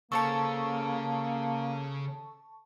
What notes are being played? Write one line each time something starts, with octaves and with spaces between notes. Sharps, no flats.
C#3 A#3 C#4 A4 C5 C#5 A5 C#6